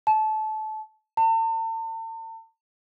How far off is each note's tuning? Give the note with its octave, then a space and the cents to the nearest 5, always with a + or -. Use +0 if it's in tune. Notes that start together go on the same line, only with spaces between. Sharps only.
A5 -25
A5 +40